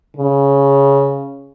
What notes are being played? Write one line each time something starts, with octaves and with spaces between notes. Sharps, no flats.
C#3